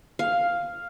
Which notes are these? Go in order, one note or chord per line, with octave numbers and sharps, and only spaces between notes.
F5